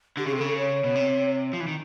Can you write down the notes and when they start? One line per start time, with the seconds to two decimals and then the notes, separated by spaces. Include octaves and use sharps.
0.17 D3 G4
0.26 C#3 G#4
0.32 C3
0.37 A4
0.41 C#3
0.47 A4
0.57 C#5
0.84 B2
0.95 C3
1.53 F3
1.60 E3
1.68 D#3